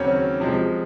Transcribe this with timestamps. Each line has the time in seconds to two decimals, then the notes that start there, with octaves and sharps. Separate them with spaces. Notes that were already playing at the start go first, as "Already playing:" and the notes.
Already playing: D#2 C#3 F#3 C4 C#4 C#5
0.40 C3 F3 G#3